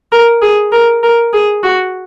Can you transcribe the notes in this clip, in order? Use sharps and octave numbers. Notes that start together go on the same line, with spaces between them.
A#4
G#4
A#4
A#4
G#4
F#4